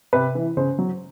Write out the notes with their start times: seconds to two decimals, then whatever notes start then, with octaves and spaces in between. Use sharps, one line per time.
0.13 C3 B4
0.35 E3
0.57 C#3 C5
0.79 F#3